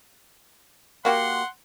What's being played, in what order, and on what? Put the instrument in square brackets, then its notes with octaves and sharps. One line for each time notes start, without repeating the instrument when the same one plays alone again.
[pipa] A#3 F#4 G4 [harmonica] F#5 C6